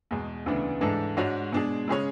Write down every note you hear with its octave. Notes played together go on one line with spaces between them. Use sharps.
E2 B2 G#3
D2 C#3 E3 B3 D4
G#2 E3 G#3 D4 A4
G#2 G#3 D4 F#4 C#5
B2 G#3 D4 G#4
C#3 G#3 C#4 G#4 C#5